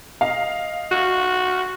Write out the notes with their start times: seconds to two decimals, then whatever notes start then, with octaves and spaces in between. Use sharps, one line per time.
0.21 D#5 F5
0.91 F#4